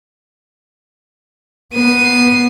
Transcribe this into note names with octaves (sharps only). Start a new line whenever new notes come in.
B3 C7 D#7